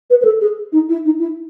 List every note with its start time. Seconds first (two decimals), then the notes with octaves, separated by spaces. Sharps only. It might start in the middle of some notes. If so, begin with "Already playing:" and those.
0.10 B4
0.21 B4
0.25 A4
0.41 G#4
0.72 D#4
0.89 E4
1.05 D#4
1.20 E4